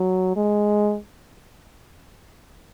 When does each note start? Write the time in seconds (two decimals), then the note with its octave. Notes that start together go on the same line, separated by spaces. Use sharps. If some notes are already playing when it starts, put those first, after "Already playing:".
Already playing: F#3
0.36 G#3